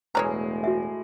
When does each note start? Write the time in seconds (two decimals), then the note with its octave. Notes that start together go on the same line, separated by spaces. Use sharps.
0.15 E1 A2 G#3 B4 C#5 D5 A#5
0.64 F#4 E5